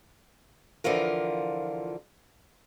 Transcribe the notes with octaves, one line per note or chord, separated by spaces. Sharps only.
D3 E3 F3 F4 A#4